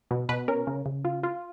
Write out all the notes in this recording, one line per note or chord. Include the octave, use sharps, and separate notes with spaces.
B2
B2 B4
C#4 A#4
C#3
C#3
F4
F4